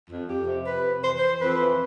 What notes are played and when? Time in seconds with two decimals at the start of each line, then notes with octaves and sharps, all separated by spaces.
0.10 F2
0.28 F2 G4
0.48 C3
0.66 F2 B4
0.85 C3
1.04 E3 C5
1.18 E3 C5
1.41 F2 B4
1.60 E3